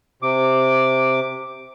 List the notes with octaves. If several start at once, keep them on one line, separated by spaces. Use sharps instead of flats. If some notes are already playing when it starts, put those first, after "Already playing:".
C3 D6